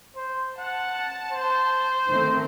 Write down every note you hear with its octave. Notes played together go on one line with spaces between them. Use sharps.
C5
F#5 A5
C5
D#3 A3 C4